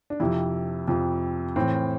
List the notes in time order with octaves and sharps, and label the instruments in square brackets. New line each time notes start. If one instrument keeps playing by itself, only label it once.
[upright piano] D4
F2 C3 F3 E4
F2 C3 F3
A2 E3 C4